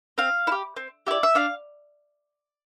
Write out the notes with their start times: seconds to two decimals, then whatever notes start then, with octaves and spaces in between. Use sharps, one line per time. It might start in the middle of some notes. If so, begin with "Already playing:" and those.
0.18 C4 F5
0.47 E4
0.52 G4
0.77 C4
1.06 E4 G4 D5
1.23 E5
1.35 D4 F5